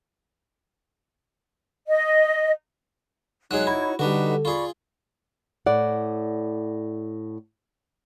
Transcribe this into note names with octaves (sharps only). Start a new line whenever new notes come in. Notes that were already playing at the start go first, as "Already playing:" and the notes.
D#5
F#3 G#3 D#4 G#4 C#5 F#6
E4 F#4
D3 G3 D4 D#4 F#4 B4
F4 G#4 D5 B5 C#6
A2 D5 F#5